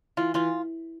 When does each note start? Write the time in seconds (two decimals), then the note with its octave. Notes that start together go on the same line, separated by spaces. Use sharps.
0.17 E3 F4
0.34 E3 F4